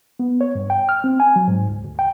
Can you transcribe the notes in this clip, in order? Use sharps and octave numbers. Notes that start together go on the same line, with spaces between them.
B3
C#5
G2
G5
F6
C4
G#5
F#3
G#2
C#2
D2
G5